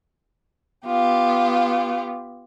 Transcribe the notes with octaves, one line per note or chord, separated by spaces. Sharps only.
B3 F4 G4